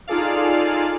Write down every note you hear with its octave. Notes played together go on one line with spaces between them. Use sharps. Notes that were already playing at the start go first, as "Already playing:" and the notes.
D#4 F4 G#4 A4 D5 F5